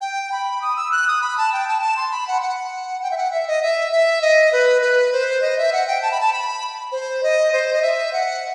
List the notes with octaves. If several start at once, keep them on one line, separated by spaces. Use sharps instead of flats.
G5
B5
D#6
E6
F#6
D#6
B5
A5
G5
A5
A5
C6
B5
F#5
F#5
G5
E5
F#5
E5
D#5
E5
E5
D#5
B4
B4
C5
D#5
E5
F#5
G5
A5
B5
A5
B5
C5
D#5
C5
D#5
E5
F#5